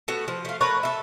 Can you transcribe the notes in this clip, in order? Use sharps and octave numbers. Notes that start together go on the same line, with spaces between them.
A3 B3 F#4
F3
A3 F5
A3 A#4 B4 C#5
A4 E5